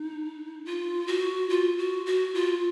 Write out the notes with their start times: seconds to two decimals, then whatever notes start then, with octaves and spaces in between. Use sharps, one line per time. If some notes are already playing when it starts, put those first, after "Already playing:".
Already playing: D#4
0.65 F4
1.08 F#4
1.50 F4
1.78 F#4
2.06 F#4
2.35 F4